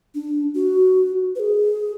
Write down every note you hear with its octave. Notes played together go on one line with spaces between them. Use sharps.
D4
F#4
B4
G#4